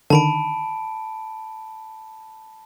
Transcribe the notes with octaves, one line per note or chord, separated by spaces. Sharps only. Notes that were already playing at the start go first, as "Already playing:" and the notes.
D3 D#3 A5 B5 D7